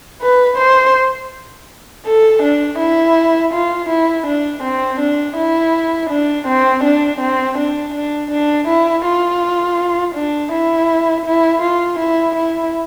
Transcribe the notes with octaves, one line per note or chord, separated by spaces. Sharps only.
B4
C5
A4
D4
E4
F4
E4
D4
C4
D4
E4
D4
C4
D4
C4
D4
D4
D4
E4
F4
D4
E4
E4
F4
E4
E4